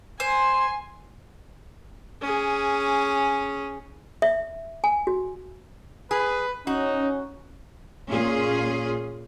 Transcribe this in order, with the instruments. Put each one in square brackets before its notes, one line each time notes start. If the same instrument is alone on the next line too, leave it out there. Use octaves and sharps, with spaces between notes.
[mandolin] C5 [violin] G#5 C6
[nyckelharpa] C#4 G#4
[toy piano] E5
G#5
F#4
[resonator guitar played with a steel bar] G#4 [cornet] B4
[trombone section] C#4 [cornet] D#4 [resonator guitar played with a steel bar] F#4
[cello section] A#2 C#4 F4 G#4